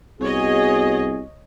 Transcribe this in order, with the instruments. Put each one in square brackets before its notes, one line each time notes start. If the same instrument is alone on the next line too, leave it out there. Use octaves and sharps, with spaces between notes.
[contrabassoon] C2 [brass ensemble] B3 F#4 G#4 [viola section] C#5 D#5